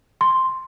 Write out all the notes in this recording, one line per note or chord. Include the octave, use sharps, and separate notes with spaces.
C6